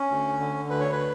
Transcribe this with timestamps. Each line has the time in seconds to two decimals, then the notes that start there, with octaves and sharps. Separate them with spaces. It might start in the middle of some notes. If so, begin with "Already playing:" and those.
Already playing: C#4
0.10 D2
0.40 D3
0.70 D2 B4
0.80 C#5
0.92 B4